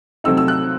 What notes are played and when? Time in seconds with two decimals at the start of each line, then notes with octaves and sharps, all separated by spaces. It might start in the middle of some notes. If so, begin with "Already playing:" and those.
0.24 C3 F#3 A3 C4 D#4 E6
0.37 E6
0.48 F#6